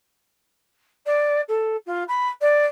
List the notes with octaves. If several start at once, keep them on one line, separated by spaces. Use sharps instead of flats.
D5
A4
F4
B5
D5